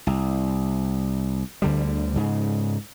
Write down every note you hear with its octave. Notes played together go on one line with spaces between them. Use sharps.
C2
D2 D3 G3
G#2 C#3